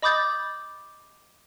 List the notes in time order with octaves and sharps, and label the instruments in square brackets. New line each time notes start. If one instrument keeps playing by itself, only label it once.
[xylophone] D#5 B5 D6 D#6 G6 A6